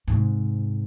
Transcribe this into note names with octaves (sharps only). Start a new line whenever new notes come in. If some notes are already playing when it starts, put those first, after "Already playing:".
G#2 C3